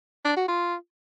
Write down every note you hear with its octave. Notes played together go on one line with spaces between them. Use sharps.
D4
F#4
F4